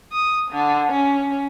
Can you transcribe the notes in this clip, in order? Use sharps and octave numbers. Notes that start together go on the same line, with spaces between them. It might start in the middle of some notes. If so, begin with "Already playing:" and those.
D#6
D3
C#4